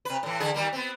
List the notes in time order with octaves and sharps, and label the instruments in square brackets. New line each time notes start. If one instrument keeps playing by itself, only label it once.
[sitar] C3 B4
A2 E3
D3 E3 G#4
D#3 G3 A#3
B3 C4